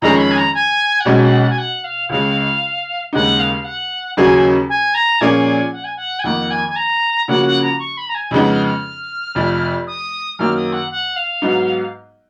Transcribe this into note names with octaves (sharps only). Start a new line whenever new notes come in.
F2 D#3 G#3 C#4 G#4 A#5
C#6
B5
G#5
A#5
G#5
F#5
B1 B2 G#3 C#4 G#5
F#5
F#5
G#5
F#5
F5
C#2 C#3 G#3 F5
D#2 C#3 G#3 D#4 F#5
F5
F#5
D#2 C#3 F#3 C#4 G#4 G#5
G#5
A#5
A#2 F3 A#3 C#4 G#4 G#5
F#5
G#5
F#5
G#5
F2 D#3 A#3 F#5
G#5
G#5
A#5
C#3 F3 A#3 C#4 F#4 F#5
F#5
A#5
C#6
B5
A#5
G#5
F2 C#3 G#3 B3 D#4 B5
F6
F6
F1 F2 F3
D#6
F#2 D#3 A#3 F6
D#6
F#5
F#5
F5
G#2 F#3 B3 D#4